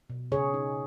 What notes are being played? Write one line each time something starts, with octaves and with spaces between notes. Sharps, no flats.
B2
C#3 G#4 C#5
D#4